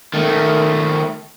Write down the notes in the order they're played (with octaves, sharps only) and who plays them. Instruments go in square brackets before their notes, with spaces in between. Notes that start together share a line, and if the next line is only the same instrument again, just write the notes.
[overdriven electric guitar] D#3 A3